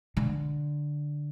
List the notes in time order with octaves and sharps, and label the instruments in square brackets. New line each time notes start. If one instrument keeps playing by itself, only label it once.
[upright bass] D3